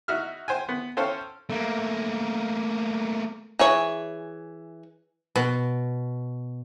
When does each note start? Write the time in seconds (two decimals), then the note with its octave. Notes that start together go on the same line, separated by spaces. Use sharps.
0.08 D#4 E4 F#4 E5 F6
0.48 C5 G5 G#5
0.69 B3
0.97 C#4 A4 C5 F5 G5
1.50 A3 A#3
3.59 E3 G#4 C#5
5.36 B2